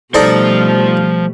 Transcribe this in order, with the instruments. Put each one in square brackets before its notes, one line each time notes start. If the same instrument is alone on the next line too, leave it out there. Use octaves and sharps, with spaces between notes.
[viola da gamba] B2 G3 A3 [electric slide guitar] F3 C5 [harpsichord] D#4 A4 D5